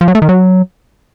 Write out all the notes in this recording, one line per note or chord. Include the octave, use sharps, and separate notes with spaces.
F3
F#3
A3
D#3
F#3